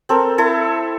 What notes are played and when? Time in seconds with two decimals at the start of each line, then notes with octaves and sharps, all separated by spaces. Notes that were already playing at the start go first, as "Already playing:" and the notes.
0.09 C4 A4 A#4
0.38 E4 A4